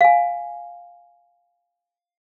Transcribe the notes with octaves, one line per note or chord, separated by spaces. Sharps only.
F5 G#5